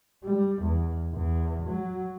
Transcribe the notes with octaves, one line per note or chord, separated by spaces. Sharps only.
G3
E2
E2
F#3